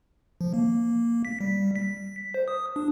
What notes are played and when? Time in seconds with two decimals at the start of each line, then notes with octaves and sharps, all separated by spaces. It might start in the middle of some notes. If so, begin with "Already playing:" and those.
0.41 F3
0.54 A#3
1.25 B6
1.41 G3
1.76 B6
2.34 C5
2.48 D#6
2.76 D4